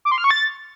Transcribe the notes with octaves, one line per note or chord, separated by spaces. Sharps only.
D6
C6
F6
C#6
A6